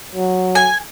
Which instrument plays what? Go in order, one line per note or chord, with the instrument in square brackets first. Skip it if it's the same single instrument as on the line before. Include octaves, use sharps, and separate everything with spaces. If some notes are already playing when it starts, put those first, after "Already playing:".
[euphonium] F#3
[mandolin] G#5